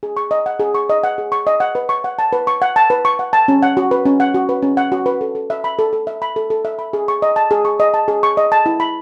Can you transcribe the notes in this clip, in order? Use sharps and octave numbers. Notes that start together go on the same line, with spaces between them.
G#4
C#6
D#5
F#5
G#4
C#6
D#5
F#5
G#4
C#6
D#5
F#5
B4
C#6
F#5
A5
B4
C#6
F#5
A5
B4
C#6
F#5
A5
C#4
F#5
F#4
B4
C#4
F#5
F#4
B4
C#4
F#5
F#4
B4
A4
A4
E5
B5
A4
A4
E5
B5
A4
A4
E5
B5
G#4
C#6
D#5
A5
G#4
C#6
D#5
A5
G#4
C#6
D#5
A5
E4
B5